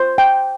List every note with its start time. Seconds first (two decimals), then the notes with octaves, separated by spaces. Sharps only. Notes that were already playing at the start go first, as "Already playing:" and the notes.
Already playing: C5
0.18 G5